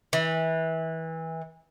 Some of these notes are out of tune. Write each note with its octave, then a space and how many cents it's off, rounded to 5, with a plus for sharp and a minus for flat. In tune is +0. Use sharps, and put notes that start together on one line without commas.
E3 -25